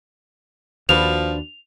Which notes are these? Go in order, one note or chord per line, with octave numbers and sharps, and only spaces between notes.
D#2 F3 D4 F#4 B4 F7